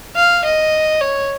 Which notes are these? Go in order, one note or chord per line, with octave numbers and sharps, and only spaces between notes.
F5
D#5
C#5